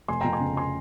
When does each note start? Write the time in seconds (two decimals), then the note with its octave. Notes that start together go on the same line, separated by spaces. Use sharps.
0.08 F1 G#5 C6
0.21 F2 G5 A#5
0.33 G#5 C6
0.40 C#3
0.57 G#5 C6